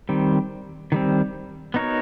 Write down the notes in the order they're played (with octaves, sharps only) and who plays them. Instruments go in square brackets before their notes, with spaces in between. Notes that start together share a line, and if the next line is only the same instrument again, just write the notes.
[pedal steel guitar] D#3 G3 C4
D#3 G3 C4
B3 D#4 F#4 A#4 C#5